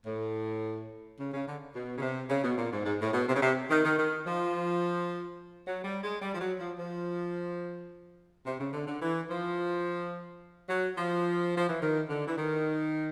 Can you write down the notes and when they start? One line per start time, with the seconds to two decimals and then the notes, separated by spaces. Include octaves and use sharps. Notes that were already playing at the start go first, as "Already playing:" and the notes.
0.06 A2
1.19 C#3
1.33 C#3
1.46 D3
1.75 B2
1.98 C#3
2.02 C3
2.30 C#3
2.44 B2
2.58 A#2
2.73 G#2
2.86 G#2
3.00 A2
3.14 B2
3.29 C3
3.35 C#3
3.42 C3
3.70 D#3
3.85 D#3
3.98 D#3
4.26 F3
5.66 F#3
5.84 G3
6.04 G#3
6.22 G3
6.34 F3
6.41 F#3
6.59 F3
6.78 F3
8.46 C3
8.60 C#3
8.73 D3
8.88 D3
9.02 E3
9.30 F3
10.69 F#3
10.97 F3
11.57 F3
11.69 E3
11.81 D#3
12.09 D3
12.27 E3
12.37 D#3